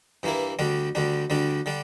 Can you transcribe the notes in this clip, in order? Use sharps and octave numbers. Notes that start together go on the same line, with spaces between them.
G2 E3 A#3 E4
D2 D3 G3 D4
D2 D3 G3 D4
D2 D3 G3 D4
D3 G3 D4